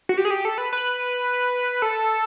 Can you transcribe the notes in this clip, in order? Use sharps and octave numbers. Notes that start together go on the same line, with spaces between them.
F#4
G4
G#4
G4
A4
B4
B4
A4